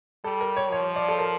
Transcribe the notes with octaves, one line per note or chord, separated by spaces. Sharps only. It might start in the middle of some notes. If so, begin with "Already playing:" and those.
G3 A4
A#4
C#5
F3 C#5
D5
A4
A#4